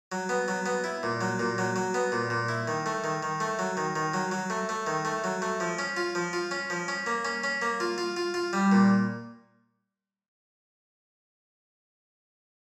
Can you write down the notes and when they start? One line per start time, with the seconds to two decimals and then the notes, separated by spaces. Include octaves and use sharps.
0.12 F#3
0.29 B3
0.48 F#3
0.66 B3
0.84 E4
1.03 A#2
1.21 F#3
1.39 A#2
1.58 F#3
1.76 F#3
1.94 B3
2.12 A#2
2.30 A#2
2.49 E4
2.68 D#3
2.86 A3
3.04 D#3
3.23 D#3
3.40 A3
3.59 F#3
3.77 D#3
3.96 D#3
4.14 F#3
4.32 F#3
4.50 A3
4.69 A3
4.87 D#3
5.05 A3
5.24 F#3
5.42 A3
5.60 F3
5.79 C#4
5.97 F4
6.15 F3
6.33 F4
6.51 C#4
6.70 F3
6.88 C#4
7.06 A#3
7.25 C#4
7.44 C#4
7.62 A#3
7.80 F4
7.98 F4
8.17 F4
8.34 F4
8.53 G3
8.72 A#2